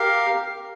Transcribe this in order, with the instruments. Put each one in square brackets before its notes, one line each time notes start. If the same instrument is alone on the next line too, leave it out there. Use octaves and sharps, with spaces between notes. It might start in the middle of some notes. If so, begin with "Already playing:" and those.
Already playing: [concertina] G4 A#4 F5